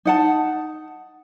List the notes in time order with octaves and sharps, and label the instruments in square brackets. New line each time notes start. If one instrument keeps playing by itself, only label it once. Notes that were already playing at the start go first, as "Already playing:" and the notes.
[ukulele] D#4 F#5 A5